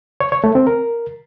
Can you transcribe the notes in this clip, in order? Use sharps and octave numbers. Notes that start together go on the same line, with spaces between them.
C#5
C#5
A3
C4
A#4